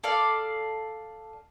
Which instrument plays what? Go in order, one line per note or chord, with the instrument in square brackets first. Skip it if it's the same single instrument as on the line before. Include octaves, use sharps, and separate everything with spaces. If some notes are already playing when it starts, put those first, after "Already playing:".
[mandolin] A4 D5 F5